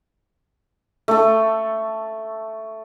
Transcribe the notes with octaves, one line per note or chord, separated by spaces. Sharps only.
A3 A4